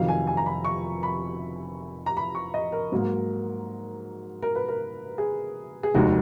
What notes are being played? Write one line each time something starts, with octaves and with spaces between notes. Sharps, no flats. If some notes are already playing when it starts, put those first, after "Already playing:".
Already playing: F1 F2 D#3 F#3 F5
G#5
G#5
A#5
B5
C#6
B5
A#5
B5
C#6
D#5
A#4
G#2 F#3 A#3
A#4
B4
A#4
G#4
G#4
F1 D#2 D#3 G#3 D#4 F#4